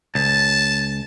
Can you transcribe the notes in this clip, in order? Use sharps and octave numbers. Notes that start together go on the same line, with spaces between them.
C#2 A5